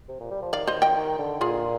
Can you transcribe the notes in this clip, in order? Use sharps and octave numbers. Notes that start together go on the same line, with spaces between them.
C3
A#2
G3
F3
D#3 D5 F5
C5 D#5
D#5 G5
D#3
D3
A#2 F4 G#4